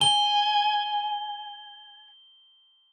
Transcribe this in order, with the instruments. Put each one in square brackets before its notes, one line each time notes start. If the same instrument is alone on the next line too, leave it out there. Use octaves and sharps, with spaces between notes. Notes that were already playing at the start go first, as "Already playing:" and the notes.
[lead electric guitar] G#5 [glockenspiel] G7